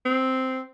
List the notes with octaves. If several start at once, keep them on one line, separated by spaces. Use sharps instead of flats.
C4